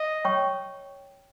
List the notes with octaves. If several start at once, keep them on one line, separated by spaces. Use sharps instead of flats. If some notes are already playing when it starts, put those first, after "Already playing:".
Already playing: D#5
C#5 G5 C#6